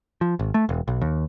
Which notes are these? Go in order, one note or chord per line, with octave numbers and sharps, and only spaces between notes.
F3
G#1
A3
E1
B1
D#2